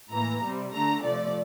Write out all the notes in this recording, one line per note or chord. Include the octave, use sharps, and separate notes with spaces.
A2 E3 A#3 A#5
C3 G3 C4
D3 A3 D4 A#5
C3 F3 A3 D5